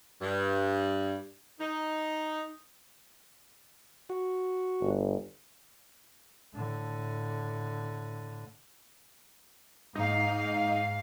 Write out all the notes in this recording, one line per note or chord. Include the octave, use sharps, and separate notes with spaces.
G2
D#4
F#4
G1
A2 D3
G#2 D#4 F5